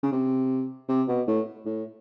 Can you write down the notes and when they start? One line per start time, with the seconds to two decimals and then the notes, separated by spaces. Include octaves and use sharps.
0.03 C#3
0.12 C3
0.89 C3
1.08 B2
1.27 A2
1.65 A2